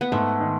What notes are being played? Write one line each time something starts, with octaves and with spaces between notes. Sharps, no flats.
B3
G#2 A3
D#3